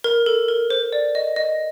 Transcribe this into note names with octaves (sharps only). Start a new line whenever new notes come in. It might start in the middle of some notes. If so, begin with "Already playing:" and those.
A#4
A4
A#4
C5
D5
D#5
D#5